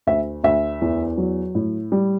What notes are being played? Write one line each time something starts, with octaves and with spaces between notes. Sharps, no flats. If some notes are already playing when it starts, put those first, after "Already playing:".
D2 E5
D2 E5
E2
F#3
A2
G3